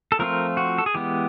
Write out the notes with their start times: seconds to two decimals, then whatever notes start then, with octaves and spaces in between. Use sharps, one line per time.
0.12 A4
0.19 F3 A3 C4 F4 A#4
0.57 F#4
0.78 A4
0.86 G#4
0.94 E3 G#3 B3 G4